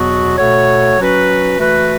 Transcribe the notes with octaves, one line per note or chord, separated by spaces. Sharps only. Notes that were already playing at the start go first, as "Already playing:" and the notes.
Already playing: E2 B2 F#3 B3 F#4
B2 A3 F#4 A4 C#5
F#3 C#4 F#4 B4
E3 A3 F#4 B4